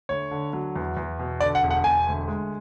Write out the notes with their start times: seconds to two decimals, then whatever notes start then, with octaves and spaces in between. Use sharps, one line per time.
0.09 D2 C#5
0.31 D3
0.53 F#3
0.76 E2
0.97 E2
1.19 B2
1.40 D3 D5
1.55 F#5
1.63 E1
1.70 F#5
1.84 E1 G#5
2.07 D2
2.28 G#3